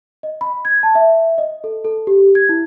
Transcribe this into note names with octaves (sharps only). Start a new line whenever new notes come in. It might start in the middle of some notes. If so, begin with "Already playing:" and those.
D#5
B5
G#6
A5
E5
D#5
A4
A4
G4
G#6
E4